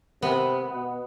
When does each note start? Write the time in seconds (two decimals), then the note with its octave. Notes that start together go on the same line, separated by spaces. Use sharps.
0.22 C3 B3
0.73 B2